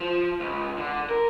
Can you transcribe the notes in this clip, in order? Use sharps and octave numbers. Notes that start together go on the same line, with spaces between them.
F3
C#2
D3
A#4